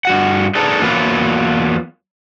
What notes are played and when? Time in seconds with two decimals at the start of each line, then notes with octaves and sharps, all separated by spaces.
0.05 G2 F#4 F#5
0.55 D4 D#4 G#4 A4 B4 D5
0.81 E2 F#3 A#3 F4 B4